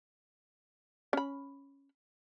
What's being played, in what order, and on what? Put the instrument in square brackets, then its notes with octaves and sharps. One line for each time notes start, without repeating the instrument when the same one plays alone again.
[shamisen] C#4 B5